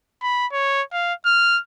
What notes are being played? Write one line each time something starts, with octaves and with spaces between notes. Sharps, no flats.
B5
C#5
F5
F6